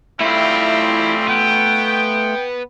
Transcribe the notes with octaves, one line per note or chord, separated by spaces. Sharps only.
G3 A3 C4 E4 F4
B3 G5